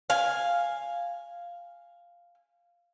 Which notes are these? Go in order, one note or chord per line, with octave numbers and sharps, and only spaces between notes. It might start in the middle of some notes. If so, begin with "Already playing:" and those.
F5 G#5